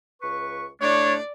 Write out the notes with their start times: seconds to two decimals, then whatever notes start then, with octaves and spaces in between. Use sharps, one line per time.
0.22 C#2 B4 C#6
0.81 A2 A3 D4 C#5 D5